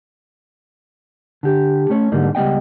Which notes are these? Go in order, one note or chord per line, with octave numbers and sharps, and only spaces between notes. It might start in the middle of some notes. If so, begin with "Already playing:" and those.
D3 G4
A3 C#4 C#5
G#2 D3 F#3 G3 A#3 D#4
C#2 G3 B3 D#5 G5